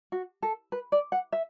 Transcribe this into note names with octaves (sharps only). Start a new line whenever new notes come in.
F#4
A4
B4
D5
F#5
E5